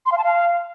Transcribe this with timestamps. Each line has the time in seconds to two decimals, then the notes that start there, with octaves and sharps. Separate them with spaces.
0.06 C6
0.12 F5
0.18 A5
0.24 F5